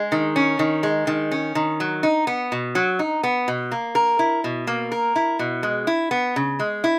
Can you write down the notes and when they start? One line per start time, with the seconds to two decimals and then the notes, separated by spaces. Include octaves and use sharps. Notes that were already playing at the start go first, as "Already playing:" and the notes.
Already playing: G#3
0.12 D#3
0.36 C#4
0.59 D#3
0.83 G#3
1.07 D#3
1.31 C#4
1.55 D#3
1.80 F#3
2.03 D#4
2.27 B3
2.52 B2
2.75 F#3
2.99 D#4
3.23 B3
3.48 B2
3.72 A#3
3.95 A#4
4.19 E4
4.44 B2
4.67 A#3
4.92 A#4
5.16 E4
5.39 B2
5.63 G#3
5.87 E4
6.11 B3
6.36 C#3
6.59 G#3
6.84 E4